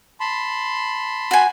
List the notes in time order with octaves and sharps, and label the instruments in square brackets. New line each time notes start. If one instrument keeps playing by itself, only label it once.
[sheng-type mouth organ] A5 B5 C6
[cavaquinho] F#4 G#5